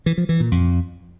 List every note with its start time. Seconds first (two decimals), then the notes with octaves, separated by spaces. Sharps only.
0.06 E3
0.18 F3
0.29 E3
0.40 A#2
0.52 F2